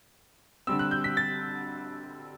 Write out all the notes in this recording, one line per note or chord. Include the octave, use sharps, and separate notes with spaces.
D3 G3 C4 E6
F#6
G6
B6
A6